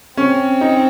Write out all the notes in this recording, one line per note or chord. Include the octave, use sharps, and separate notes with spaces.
C4 C#4
D#4